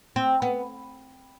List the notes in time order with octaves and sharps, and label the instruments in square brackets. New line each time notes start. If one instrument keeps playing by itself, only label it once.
[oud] C4
B3